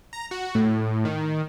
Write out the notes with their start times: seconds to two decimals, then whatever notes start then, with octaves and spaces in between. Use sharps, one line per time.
0.13 A#5
0.31 F#4
0.55 A2
1.05 D#3